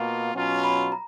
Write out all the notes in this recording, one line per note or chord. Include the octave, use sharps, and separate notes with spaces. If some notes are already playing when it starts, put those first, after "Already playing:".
Already playing: B2 A#3 F4 A#5
B2 F#3 C#4 F4
B5
A#5